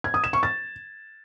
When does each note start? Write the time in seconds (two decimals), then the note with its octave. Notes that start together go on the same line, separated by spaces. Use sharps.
0.04 G#6
0.14 D#6
0.24 E7
0.33 C#6
0.43 A6